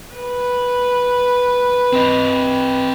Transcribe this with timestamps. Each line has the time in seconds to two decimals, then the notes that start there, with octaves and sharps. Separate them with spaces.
0.15 B4
1.93 C4 D#5